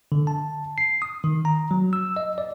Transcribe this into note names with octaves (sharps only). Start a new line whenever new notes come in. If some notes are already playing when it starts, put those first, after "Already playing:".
D3
A5
C7
D#6
D#3
A#5
F#3
E6
D#5
D5